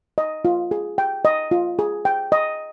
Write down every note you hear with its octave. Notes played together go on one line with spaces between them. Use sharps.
D#5
F4
G#4
G5
D#5
F4
G#4
G5
D#5